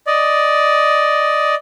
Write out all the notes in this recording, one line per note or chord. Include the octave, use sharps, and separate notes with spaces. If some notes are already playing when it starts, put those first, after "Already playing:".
D5 D#5